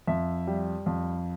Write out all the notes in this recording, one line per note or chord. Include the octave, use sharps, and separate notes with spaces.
F2 E5
G3
F2